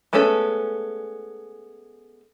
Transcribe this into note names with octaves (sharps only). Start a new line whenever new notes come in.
G#3 A3 B3 C#4 A4